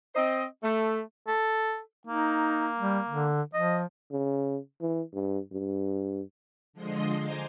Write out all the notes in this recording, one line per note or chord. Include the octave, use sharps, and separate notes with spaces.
C4 C5 D#5
A3
A4
A#3 D#4
G3
D3
F3 D#5
C#3
E3
G2
G2
D3 F3 G#3 D#5 C6
C5 G#5 A#5 C6 D6